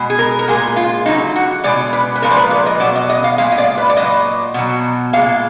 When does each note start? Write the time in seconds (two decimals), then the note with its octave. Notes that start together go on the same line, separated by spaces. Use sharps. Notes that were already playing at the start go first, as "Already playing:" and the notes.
Already playing: B2 G#3
0.10 G#4
0.19 A#4
0.39 A#4
0.47 A#2 G#3 G#4
0.76 F4
1.06 D3 F#3 D#4
1.36 F#4
1.64 B2 G#3 D5
1.93 B4
2.15 B4
2.22 A#2 F3 G#3 A#4
2.31 D5
2.37 B4
2.51 D5
2.66 D#5
2.80 B2 F#3 D5
2.96 D#5
3.10 D#5
3.24 F5
3.38 A#2 G#3 F5
3.52 D#5
3.58 D5
3.77 B4
3.90 D5
3.97 A#2 F#3 D#5
4.54 B2 F#3
5.13 A#2 G#3 F5